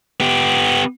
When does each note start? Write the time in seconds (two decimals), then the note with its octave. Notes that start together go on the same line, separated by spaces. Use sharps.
0.20 B3 G4